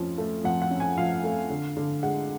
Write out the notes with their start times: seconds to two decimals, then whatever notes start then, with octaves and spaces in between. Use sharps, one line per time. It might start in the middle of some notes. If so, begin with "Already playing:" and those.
Already playing: F2 F3 C#4
0.18 A3
0.44 F2 F#5
0.62 F#5
0.71 C#4
0.80 G#5
0.97 F3 F5
1.24 A3
1.50 D3
1.77 D3
2.03 G#3 F#5